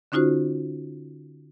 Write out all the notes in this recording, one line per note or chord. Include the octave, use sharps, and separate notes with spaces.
D3 C#4 D#4 F4 F#4 C5